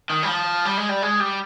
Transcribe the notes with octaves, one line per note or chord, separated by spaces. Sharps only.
D#3
G3
F3
G3
G#3
G3
G#3
G3